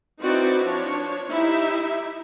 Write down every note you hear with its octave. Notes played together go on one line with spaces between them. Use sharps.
C4 D#4 E4 F#4 B4 D5
F3 D4 C#5
D#4 E4 G4 E5